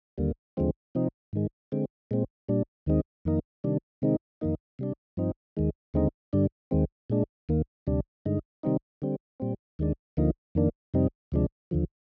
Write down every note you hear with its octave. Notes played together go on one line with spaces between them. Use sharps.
D#2 D3 G3 A#3
D#2 D3 F3 G#3 C4
C3 F3 C4 D#4
G#2 D#3 G#3
D3 G#3 C4
A#2 G#3 C4
A#2 G3 D4
D#2 D#3 G#3 C4 D#4
F2 D#3 A#3 D#4
C3 D#3 G3 D4
C3 D#3 G#3 C4 D#4
F2 D#3 A#3 D#4
C3 G3 D4
G2 F3 C4 D#4
D#2 D#3 G#3
D#2 D3 G#3 C4 D#4
G2 D3 G3 D4
D#2 D#3 G#3 C4
A#2 G#3 D4
D#2 D#3 A#3
D2 C3 G3 D4
G2 D3 G#3 D#4
C3 D#3 G3 C4 D#4
D3 G3 C4
A#2 G3 C4
D#2 D#3 G#3 D4
D2 D3 F3 A#3 D#4
F2 D#3 A#3 D4
F2 C3 G3 C4 D#4
D2 C3 F3 G#3 D4
D#2 D3 F3